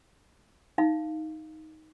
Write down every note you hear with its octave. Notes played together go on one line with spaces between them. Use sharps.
D#4 F5